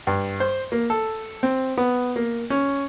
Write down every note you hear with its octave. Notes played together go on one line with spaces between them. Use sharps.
G2
C5
A#3
A4
C4
B3
A#3
C#4